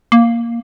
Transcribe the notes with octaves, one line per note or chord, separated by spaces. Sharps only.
A#3